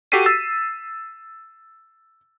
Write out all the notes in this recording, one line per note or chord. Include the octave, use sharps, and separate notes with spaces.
F#4 G4 A4 B6 C7 D#7
E6 A6